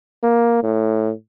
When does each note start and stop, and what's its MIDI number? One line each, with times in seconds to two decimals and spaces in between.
0.23 0.58 58
0.63 1.12 45